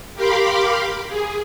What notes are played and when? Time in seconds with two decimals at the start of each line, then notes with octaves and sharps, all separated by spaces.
0.15 G4 A#4 F5 B5 C6 D6
1.09 G#4